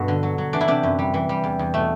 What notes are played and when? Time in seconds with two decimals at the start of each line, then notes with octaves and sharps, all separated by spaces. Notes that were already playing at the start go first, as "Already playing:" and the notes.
Already playing: G2 B2 F#4 A4
0.08 D3
0.23 F#3
0.38 F#3
0.53 E3 D4
0.61 E4
0.68 C3 D4
0.83 F#2
0.99 G3
1.14 E3
1.29 G3
1.44 E2
1.59 E2
1.74 B2 A3